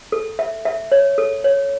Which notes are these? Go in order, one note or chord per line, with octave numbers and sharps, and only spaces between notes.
A4
E5
E5
C#5
A4
C#5